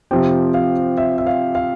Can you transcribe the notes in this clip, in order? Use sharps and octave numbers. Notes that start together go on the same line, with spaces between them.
C3 F3 C4 G4 G5
F5
E5
E5
F5
F5